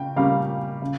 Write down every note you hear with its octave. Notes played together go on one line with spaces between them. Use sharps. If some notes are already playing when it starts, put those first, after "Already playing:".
Already playing: C#3 G5
C#3 G3 A#3 C#4 F5
C#3